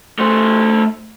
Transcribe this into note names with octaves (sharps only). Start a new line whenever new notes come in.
A3 C5